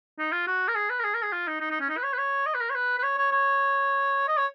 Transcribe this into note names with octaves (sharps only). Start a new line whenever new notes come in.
D#4
F4
F#4
A#4
G#4
B4
A#4
G#4
A#4
G#4
F4
D#4
D#4
D#4
C#4
D#4
B4
C#5
B4
C#5
D#5
B4
A#4
C#5
B4
B4
C#5
C#5
C#5
D#5
C#5